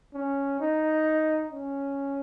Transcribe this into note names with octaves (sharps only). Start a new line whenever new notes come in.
C#4
D#4
C#4